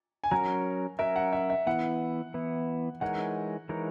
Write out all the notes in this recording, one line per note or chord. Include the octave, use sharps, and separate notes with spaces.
G#5
F#3 C#4 F#4 A#4 A#5
F#3 C#4 F#4 A#4 E5
F#5
E5
E5
E3 B3 E4 F#5
E3 B3 E4
E3 G#3 D#4 A#4 C#5 F#5
E3 G#3 D#4 A#4 C#5